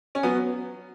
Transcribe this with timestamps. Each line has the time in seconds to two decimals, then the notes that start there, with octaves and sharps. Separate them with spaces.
0.15 C#4
0.23 F#3 B3